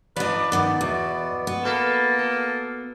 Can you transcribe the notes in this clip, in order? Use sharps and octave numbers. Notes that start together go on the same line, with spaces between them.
E3 D4 B4 D5 D#5
D#3 B3 C5 D5
E2 B2
B3
A#3 A4 B4
A4